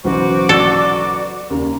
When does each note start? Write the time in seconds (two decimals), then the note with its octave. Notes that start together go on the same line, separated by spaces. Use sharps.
0.04 B1 C#3 E3 F#4 C5 C#6 D6
0.49 A4 D5
1.50 D#2 C#3 A#5